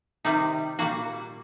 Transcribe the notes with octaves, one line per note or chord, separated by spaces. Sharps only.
C3 D#3 G3 D#4
A#2 G3 A#3 F#4